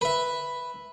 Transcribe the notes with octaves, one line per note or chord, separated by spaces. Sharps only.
B4 E5